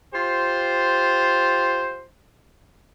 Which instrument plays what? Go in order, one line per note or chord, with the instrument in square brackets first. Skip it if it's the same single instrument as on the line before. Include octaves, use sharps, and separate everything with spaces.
[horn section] F4 G4 C5